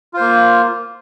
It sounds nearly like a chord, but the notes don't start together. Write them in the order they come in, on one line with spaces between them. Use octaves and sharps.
F4 C5 A#3